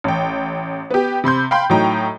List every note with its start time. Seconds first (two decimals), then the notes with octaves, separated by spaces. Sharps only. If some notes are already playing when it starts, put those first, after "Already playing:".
0.04 A1 G5
0.90 B3 G4
1.24 C3 B5 C6 G6
1.51 F5 G5 B5 C6
1.70 A2 F#3 D#4 G5 A#5